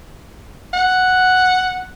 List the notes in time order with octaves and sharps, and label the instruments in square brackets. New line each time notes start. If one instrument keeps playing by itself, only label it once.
[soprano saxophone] F#5